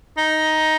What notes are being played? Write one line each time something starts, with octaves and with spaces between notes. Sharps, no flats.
D#4